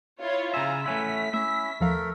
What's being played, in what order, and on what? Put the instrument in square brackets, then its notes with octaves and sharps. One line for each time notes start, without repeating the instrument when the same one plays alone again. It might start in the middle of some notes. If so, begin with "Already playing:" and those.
[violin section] E4 F4 C#5
[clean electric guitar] C#3 E5 [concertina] F4 G#5 [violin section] A#5
[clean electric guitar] A3 C#4 E4 [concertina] F#5 [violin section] B6
[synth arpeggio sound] A3 [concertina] C#4 E4 [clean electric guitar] E5
[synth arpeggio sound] D#2 F3 F5 [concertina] A3 A4 A#4